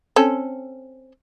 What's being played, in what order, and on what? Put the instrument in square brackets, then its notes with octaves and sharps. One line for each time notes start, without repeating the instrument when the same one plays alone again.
[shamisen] C4 C#4 A4